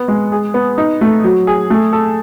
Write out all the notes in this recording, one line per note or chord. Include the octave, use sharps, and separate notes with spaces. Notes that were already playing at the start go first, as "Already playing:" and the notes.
Already playing: B3
G#3
G#4
B3
D#4
A3
F#3
G#4
A3
A4